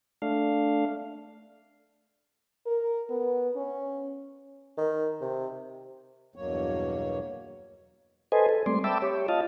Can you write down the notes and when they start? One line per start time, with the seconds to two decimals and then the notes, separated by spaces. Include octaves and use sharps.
0.22 A3 D4 F5
2.66 A#4
3.10 B3
3.56 C#4
4.77 D#3
5.21 C3
6.36 E2 G2 B2 F#3 A#3 C#5
8.32 A4 B4 C5 D#5 G#5
8.49 A4
8.66 G3 A3 C4 D5 C6
8.84 E5 G5 A5 B5 D6 E6
9.02 G4 C#5
9.28 F4 D#5 F5 A5